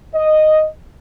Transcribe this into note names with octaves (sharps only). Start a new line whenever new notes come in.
D#5